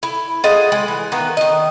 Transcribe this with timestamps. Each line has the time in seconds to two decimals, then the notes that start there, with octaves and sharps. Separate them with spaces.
0.03 E4
0.44 F4 G#4 D#5 F#5
0.72 G#3
0.88 E3
1.12 D#3 E3 A#3 B3
1.37 D#3 D#5